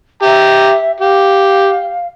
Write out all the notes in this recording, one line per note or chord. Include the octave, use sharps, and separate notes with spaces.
G4 E5 A#5
G4 F5